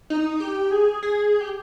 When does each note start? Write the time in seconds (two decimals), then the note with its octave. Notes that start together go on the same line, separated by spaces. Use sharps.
0.10 D#4
0.40 G4
0.71 G#4
1.03 G#4
1.41 G4